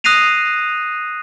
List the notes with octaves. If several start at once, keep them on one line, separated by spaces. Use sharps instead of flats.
D#6 F#6 A#6 C7 D#7 F7